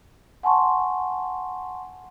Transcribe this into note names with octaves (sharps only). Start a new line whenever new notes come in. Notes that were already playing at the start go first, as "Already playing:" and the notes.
F#5 G#5 A5 C6 C#6